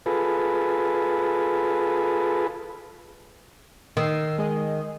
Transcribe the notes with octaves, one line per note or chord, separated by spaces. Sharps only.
F4 G#4 A4 B4
D#3 E6 C7
G#3 G#4 D#5